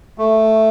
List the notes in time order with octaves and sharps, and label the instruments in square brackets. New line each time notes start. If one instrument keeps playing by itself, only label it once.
[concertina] A3